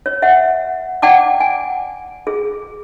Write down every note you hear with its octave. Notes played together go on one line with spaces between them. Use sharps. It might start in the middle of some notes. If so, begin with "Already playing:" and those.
C#5
E5 F#5
D5 F#5 G5 A5 D6
G#5
G#4